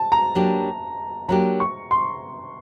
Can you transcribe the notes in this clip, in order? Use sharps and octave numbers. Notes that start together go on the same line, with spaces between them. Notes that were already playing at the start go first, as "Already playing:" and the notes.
Already playing: A5
A#5
F#3 A#3 D4 G4
F#3 A#3 D4 G4 A#5
C#6
C6